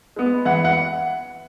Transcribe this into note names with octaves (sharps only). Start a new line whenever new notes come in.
G#3 B3
E3 F#5
F#5